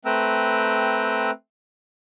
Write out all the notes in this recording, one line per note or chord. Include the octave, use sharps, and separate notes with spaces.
A3 C4 B4 G5 A#5 E6